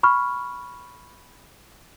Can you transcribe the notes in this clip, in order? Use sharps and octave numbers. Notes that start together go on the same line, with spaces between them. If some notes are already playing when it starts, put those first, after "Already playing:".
B5 C#6 F6